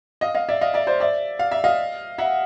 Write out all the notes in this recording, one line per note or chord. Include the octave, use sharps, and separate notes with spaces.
D#5 F5
D#5 F5
D5 E5
D#5 F5
D5 E5
C5 D5
D5 E5
F5
E5
D#5 F5
E5 F#5